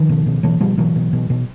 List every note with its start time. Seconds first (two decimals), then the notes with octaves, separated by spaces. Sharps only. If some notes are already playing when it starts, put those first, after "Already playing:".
Already playing: D#3 F3
0.09 B2
0.26 B2
0.43 B2 E3 F#3
0.60 B2 F3 G3
0.78 B2 E3 F#3
0.96 B2
1.13 B2
1.30 B2